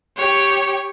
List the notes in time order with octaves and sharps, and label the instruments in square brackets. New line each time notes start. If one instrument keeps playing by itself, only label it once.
[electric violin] G4 C#5